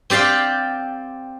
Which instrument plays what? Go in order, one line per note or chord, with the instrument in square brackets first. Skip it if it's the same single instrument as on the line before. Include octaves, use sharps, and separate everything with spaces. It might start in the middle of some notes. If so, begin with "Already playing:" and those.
[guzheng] C4 G4 D5 F5 G5